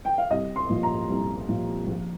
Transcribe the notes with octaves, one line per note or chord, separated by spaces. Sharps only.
G5
F5
C2 D#5
C6
A#2 F3
A#5
C2
A#2 F3
A#1